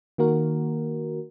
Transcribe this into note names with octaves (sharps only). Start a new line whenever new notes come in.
D#3 A#3 F#4 A#4